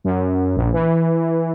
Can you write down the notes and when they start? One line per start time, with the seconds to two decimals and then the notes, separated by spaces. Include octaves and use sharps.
0.04 F#2
0.56 A#1
0.73 E3